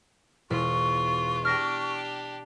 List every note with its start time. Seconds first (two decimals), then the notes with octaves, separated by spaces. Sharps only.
0.50 E1 F4 C#6
1.45 D4 G4 F6 A#6